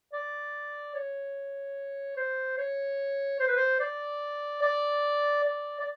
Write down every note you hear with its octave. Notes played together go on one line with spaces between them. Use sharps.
D5
C#5
C5
C#5
C5
B4
C5
D5
D5
D5
D5